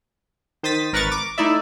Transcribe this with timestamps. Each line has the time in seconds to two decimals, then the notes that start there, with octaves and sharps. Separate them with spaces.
0.63 D#3 C5 D#6 A6 B6
0.93 G#1 A#4 B4 A#5 C#6 A6
1.12 D6
1.38 A3 D#4 E4 D5 E5